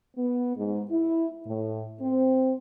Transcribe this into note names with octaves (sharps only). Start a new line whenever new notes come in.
B3
G#2
E4
A2
C4